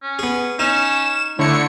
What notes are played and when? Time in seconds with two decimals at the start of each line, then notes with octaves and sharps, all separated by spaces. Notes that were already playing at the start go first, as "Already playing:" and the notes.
0.03 C#4
0.19 B3 G#4
0.59 C#4 D#4 E7
1.39 D3 A3 E4 C#5 C#7